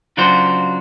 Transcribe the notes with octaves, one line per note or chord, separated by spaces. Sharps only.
C#3 F#3 D4 F4 F#4 C5